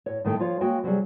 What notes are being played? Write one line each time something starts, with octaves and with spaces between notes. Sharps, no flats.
A2 C#5
A2 D#3 A3 G5
F3 F4 C#5
G#3 A#3 F#4 C#5 G5
C3 F#3 G3 G#4